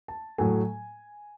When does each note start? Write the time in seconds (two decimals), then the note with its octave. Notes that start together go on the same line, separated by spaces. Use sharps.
0.08 A5
0.38 A2 F#3 A3 G#5